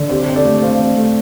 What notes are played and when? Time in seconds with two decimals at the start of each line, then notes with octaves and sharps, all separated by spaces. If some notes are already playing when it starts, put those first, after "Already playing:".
Already playing: D3
0.09 C4 G4 C5
0.27 C4 C5
0.36 A4 D5
0.45 A3
0.62 C4 C5 F5
0.80 C4
0.97 A3